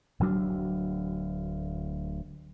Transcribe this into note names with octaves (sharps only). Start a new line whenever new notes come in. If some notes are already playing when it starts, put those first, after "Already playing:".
D1 D2 F#3 D4